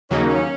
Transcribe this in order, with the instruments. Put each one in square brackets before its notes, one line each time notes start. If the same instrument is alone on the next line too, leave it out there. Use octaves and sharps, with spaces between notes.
[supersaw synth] D#2 C#3 F#3 A#3 D#4 [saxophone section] C#4
[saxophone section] C#4